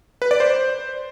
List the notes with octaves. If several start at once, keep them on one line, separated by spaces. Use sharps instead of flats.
B4
D5
C5